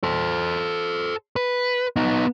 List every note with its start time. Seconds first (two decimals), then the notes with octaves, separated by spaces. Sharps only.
0.03 A4 C5
1.36 B4
1.96 B3 D#4